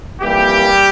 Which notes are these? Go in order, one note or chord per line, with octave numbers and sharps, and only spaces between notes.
F2 E3 G3 A#3 G4